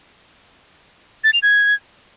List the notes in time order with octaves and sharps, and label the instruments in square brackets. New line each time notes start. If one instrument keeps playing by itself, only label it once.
[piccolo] A6
F7
G#6